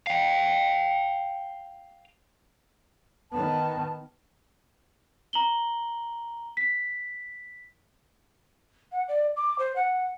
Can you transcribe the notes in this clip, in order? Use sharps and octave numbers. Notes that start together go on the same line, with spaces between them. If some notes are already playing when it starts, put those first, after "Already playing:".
F5 G5
D#3 B3 A5
A#5 F#7 G7
B6
F#5
D5
D6
C5
F#5